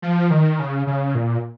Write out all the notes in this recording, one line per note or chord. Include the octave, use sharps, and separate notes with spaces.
F3
D#3
C#3
C#3
A#2